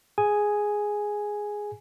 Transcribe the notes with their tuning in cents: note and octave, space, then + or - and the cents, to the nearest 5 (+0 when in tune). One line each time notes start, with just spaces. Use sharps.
G#4 +0 G#5 +0